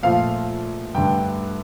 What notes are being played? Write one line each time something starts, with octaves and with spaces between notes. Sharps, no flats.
A#2 F3 A3 F5
G2 D3 A3 G5